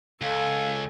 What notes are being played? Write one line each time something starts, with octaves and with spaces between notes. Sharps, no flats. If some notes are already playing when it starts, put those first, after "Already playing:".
C#2 A4 F5 G#5